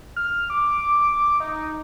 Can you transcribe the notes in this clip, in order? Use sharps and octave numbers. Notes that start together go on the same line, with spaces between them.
F6
D6
D#4